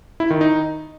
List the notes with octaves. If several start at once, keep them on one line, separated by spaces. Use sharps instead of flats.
E4
D#3
D#4